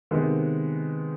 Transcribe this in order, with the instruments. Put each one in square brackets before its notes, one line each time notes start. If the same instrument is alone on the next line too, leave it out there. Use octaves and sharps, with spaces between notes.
[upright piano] C3 D#3 G#3 B3